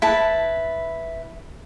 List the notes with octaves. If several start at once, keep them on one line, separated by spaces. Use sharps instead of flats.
E4 B4 A5